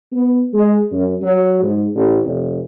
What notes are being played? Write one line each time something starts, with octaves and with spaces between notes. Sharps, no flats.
B3
G#3
F#2
F#3
G#2
A1
F1